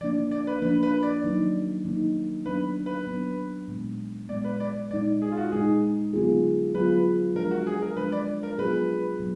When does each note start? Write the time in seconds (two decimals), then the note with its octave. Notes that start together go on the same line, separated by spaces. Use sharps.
0.01 F3 A#3 D4 D5
0.31 D5
0.47 B4
0.62 F3 A#3 D4 B4
0.83 B4
1.03 D5
1.24 D#3 F#3 A#3 D#4
1.85 D#3 F#3 A#3 D#4
2.46 F#3 B3 D4 B4
2.86 B4
3.07 F#3 B3 D4
3.68 A#2 G#3 B3
4.29 A#2 G#3 B3 D5
4.44 B4
4.60 D5
4.91 A#2 G#3 D#4 D5
5.22 G#4
5.32 F4
5.37 F#4
5.52 A#2 G#3 D#4 G#4
6.13 D3 F#3 B3 F4 G#4
6.74 D3 F#3 B3 F4 G#4 B4
7.35 F3 G#3 D4 A#4
7.51 F#4
7.67 G#4
7.82 A#4
7.97 F3 G#3 D4 B4
8.12 D5
8.43 A#4
8.58 B2 F#3 B3 F4 G#4 B4
9.19 B2 F#3 B3